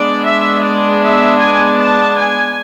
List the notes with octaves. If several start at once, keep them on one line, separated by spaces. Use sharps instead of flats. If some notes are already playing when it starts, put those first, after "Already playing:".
Already playing: G#3 B3 D4 D5
E5
D5
E5
G#5
A5
G#5